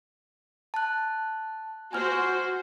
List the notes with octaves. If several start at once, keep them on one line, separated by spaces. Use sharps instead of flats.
A5 F#6
F#4 C5 G#5 F6